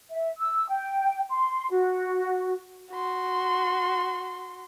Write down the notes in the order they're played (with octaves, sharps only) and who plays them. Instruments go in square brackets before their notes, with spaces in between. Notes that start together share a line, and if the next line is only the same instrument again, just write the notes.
[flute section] E5
E6
G5
C6
F#4
[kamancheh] F#4 C6